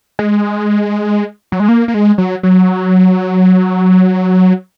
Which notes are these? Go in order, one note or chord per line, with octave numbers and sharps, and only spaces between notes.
G#3
F#3
G#3
A#3
A#3
G#3
F#3
F#3